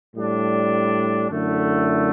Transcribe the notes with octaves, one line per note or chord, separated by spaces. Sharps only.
A2 G3 D4
F#2 D3 A3 E4